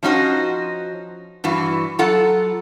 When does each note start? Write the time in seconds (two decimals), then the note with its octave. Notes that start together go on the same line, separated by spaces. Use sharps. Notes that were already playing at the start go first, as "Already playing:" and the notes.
0.03 F3 C#4 D#4 F#4 C5
1.44 G2 E3 F#4
1.99 F#3 F4 A4 F#5